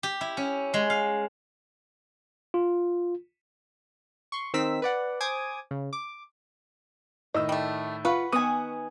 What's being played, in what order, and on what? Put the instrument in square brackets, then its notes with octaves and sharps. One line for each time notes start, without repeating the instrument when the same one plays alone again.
[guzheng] G4
E4
C#4
G#3
F5
[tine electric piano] F4
[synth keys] C6 C#6
D#3 C4 D#4 E6 B6
B4 D5 F#5
C5 G#5 D6 D#6 G#6
C#3
D6
[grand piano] A2 D#3 E6 [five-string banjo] D#5
[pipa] G3 A3
[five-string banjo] F4 [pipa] B4 [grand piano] F#5 C#6
[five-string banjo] D#3 B3 [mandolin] G#5 D#6